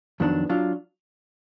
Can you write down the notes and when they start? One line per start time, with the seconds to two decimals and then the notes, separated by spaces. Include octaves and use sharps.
0.20 F2 D#3 F#3 B3 D4
0.49 F#3 D4 F4